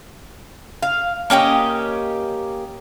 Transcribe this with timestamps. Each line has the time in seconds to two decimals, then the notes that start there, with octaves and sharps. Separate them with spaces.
0.82 F5
1.30 A#3 C#4 G4 D#5